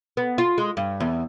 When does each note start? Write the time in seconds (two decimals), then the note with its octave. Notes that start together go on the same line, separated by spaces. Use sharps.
0.17 B3
0.38 F4
0.58 G#3
0.77 G2
1.00 E2